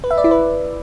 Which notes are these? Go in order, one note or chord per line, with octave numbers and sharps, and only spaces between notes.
B4
E5
D5
E4
B4